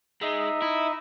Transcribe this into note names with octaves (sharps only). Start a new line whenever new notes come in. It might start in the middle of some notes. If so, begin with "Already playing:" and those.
G#3 D#4 D#5 E5
E4